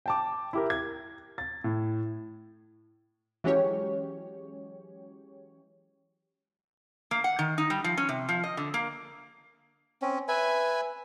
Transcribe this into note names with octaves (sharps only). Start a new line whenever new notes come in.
G5 A5 D6
E4 G4 A#4
G#6
A6
A2
E3 F#3 G#3 C#4 G4 C#5
A#3
F#5
D#3
D#4
G3
F3
C#4
C3
F3
D#5
D3
A#3
C4 C#4
B4 E5 G#5